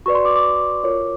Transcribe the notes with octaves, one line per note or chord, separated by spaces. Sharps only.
F#4 B4 D5 C#6
C6
D6
D6
F4 A#4 C#5